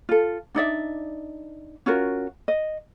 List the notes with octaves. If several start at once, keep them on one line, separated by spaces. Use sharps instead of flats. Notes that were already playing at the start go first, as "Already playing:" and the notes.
F4 A4
D4 D#4 D5 E5
C#4 F4 F#4 A#4
D#5